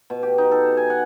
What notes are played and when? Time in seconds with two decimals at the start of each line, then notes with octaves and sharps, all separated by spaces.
0.10 B2
0.23 G4
0.38 D#4
0.51 A4
0.77 G#5
0.90 F#5